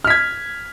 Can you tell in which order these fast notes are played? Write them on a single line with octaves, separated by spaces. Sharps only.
F6 B6 G#6